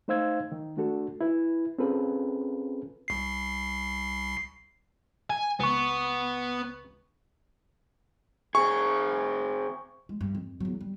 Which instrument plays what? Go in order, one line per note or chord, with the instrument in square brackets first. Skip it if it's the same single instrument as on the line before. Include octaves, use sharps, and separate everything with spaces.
[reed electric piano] A3 D#4 C5 F5 E6 G#6
D#3
A3 D4 F#4 A4
E4 B4
C4 C#4 F4 G#4 A4 B4
[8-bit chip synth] C2 C7
[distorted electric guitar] G#5
[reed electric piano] C#2 C#6 [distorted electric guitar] B3
[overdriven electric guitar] C4 G#4 [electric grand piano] C#6
[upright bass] G#3
G2
F2
E2 F#3
G3